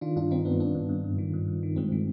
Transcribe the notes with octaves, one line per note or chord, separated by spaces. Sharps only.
D#3 D4 F4
G2 D4 F4
D#3 C4 D#4
G2 B3 D4
G2 B3 D4
G2
G2
G2
D#3
G2
G2
D#3
G2 G#3 C4
D#3